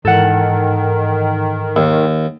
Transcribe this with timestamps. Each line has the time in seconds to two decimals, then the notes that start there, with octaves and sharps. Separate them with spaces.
0.05 G#2 D#3 E3 A4 F#5
1.76 D#2